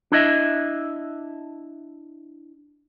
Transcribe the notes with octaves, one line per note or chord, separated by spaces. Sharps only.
D4 E4 D#5 E5